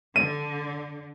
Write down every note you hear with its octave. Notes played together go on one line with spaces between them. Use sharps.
D3 D#7